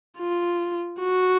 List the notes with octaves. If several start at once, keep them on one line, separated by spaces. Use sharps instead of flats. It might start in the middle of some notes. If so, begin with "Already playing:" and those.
F4
F#4